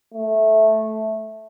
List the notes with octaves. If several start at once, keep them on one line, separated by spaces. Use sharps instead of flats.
A3